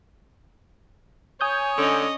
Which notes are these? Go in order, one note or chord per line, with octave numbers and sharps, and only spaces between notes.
C#5 G#5 D#6 G6
D3 C#4 D#5